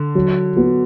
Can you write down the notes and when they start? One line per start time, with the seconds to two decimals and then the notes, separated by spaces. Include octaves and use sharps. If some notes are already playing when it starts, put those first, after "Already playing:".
Already playing: D3
0.15 F#3
0.57 B3 F#4